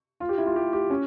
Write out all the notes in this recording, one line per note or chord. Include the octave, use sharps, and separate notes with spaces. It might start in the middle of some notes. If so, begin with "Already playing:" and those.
F4
G4
E4
F4
G4
G4
C#4